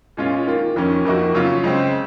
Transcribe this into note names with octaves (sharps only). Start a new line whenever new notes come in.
A#2 G#3 C#4 F4
D#3 A#3 F4
F2 D#3 A#3 C#4
F2 D#3 A#3 D#4 F#4
C#3 F#3 C#4 F4
C#3 G#3 C4